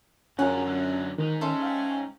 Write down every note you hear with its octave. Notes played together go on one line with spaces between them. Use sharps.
F#2 D3 C#4 F4 G#4 F#5 A#5
D3 F#3
G#2 D#3 D#4
C#4 A4 E5 C6
F5 G5